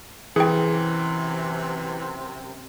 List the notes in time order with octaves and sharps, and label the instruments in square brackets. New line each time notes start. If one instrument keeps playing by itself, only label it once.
[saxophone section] F#2 C3 [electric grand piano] E3 [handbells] G#4 G5